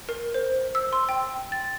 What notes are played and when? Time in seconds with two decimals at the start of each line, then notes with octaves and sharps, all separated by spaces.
0.09 A#4
0.34 C5
0.75 E6
0.93 C6
1.09 G5
1.52 A6